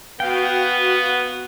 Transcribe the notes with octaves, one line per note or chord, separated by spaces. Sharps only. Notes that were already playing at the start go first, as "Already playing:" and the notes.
B3 F#4 F5 G5